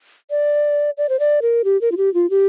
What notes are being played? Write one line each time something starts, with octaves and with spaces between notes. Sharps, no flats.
D5
D5
C5
D5
A#4
G4
A#4
F4
G4
F4
G4